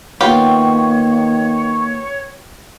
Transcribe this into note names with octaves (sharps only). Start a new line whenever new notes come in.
D#3 A#3 B3 F4 G4 C#5